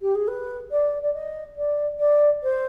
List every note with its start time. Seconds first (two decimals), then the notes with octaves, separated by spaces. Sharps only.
0.02 G4
0.15 G#4
0.28 B4
0.71 D5
1.03 D5
1.14 D#5
1.57 D5
1.99 D5
2.43 C5